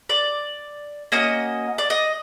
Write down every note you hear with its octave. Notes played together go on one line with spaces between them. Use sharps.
D5
A#3 C#4 F#4 D#5
D5
D#5